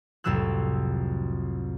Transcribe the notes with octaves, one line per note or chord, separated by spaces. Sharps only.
C2 F2 A2 F#3 E6 F#6